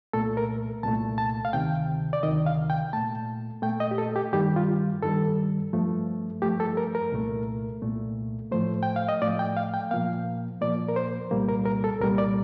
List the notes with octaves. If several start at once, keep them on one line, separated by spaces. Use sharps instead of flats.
C2 A#2 A3 A4
A#4
C2 A#2 A3 A5
A5
F5
D2 C3 D#3 G5
D5
D2 C3 D#3 D#5
F5
G5
A#2 A3 A5
A#2 A3 G5
D#5
G4
A4
G4
G2 D#3 G3 G4
F4
G2 D#3 G3 A4
G2 F3 A3
G2 F3 A3 G4
A4
A#4
A#4
C2 A#2 A3
C2 A#2 A3
A2 F3 A3 C5
G5
F5
D#5
A2 F3 A3 D5
G5
F5
G5
A#2 F3 A#3 F5
A#2 F3 A#3 D5
A#4
C5
C2 A#2 G3 A#3
A#4
A#4
A4
C2 A#2 G3 A#3 A#4
D5